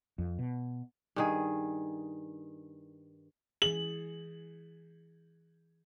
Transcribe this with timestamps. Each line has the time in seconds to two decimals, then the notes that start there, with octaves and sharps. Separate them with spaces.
0.18 F2
0.39 B2
1.16 G2 D#3 G#4
3.62 E3 G#4 F#7